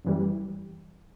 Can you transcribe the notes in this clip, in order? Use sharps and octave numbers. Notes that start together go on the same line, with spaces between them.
F#2 E3 G3